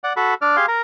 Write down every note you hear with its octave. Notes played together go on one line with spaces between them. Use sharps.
D5 F#5
F#4 A4 B5
D4 D5 F6
G4 G#4 F5 C6
A#4 A#5